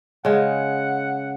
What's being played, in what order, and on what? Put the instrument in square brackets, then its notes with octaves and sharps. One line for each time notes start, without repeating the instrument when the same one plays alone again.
[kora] C#3 G#3 [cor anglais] F#5